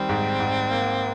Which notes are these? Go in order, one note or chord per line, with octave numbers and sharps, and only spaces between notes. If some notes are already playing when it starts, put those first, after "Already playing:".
Already playing: D#3 G3 C4
G#2
G#2
A#3